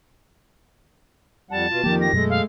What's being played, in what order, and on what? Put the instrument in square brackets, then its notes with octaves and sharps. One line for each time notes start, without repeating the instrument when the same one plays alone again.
[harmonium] F2 G3 F#5 [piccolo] A5
[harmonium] B2 F4
[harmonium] F2 D#3 G4 [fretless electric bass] F3 A#3
[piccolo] A#6
[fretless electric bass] F#2 B2 F#3 [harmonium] G#3 A3
[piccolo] F5